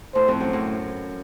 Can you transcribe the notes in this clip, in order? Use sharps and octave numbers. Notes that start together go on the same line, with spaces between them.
A2 C5
F2
F#2
A2